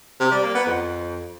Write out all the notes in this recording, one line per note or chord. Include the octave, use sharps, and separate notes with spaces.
C3
G3
A#3
B3
F2